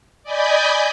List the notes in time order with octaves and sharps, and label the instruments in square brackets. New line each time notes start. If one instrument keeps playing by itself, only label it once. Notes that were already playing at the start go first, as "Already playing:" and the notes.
[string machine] D5 D#5 G#5 B5 G6